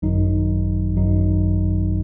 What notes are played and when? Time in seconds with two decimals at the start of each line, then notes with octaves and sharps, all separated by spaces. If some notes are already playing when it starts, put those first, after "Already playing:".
0.02 G#1 F#2 D#3 F#3 D#4
0.95 G#1 F#2 D#3 F#3 D#4